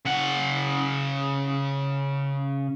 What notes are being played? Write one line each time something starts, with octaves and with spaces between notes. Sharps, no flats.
C#3 F#5